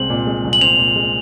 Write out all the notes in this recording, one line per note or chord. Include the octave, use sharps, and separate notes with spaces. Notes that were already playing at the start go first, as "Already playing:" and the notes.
Already playing: C2 G#3 C4 F#7
A#2
G#3
C2
F#7
C4 F7
A#2
G#3